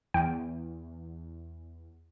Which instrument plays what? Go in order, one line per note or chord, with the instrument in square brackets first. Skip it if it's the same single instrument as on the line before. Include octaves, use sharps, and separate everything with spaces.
[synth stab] E2 [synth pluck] G5